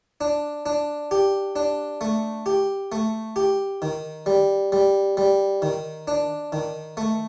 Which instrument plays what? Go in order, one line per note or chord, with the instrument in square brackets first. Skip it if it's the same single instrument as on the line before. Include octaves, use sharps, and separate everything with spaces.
[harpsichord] D4
D4
G4
D4
A3
G4
A3
G4
D#3
G3
G3
G3
D#3
D4
D#3
A3